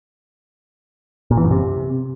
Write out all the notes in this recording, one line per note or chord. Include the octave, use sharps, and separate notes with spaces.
A#2
E3
F#2
C3